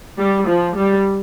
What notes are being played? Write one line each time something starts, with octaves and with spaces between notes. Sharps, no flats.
G3
F3
G3